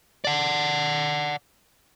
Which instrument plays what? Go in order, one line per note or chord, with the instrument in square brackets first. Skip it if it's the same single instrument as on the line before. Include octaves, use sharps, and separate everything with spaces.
[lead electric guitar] D5 F#5